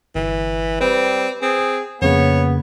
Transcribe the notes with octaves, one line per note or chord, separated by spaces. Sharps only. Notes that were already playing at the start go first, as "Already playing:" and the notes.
G1 E3
G3 C4 B4
C4 G#4
F2 C#3 A#3 B3 C#5